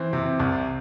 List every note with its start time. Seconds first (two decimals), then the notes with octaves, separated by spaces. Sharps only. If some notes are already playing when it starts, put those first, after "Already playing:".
Already playing: E3 C4
0.13 C3
0.40 C2